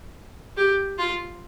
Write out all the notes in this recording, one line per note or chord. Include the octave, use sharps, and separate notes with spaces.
G4
F4